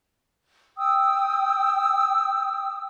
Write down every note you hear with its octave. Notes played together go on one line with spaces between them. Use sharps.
G5 D#6 E6